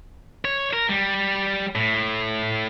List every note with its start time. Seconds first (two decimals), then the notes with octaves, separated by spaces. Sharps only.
0.45 C#5
0.73 A#4
0.89 G3
1.75 A2